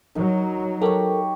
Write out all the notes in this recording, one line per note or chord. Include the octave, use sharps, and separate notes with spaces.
F#3 D#4 A#4
G4 A4 A#4 C#5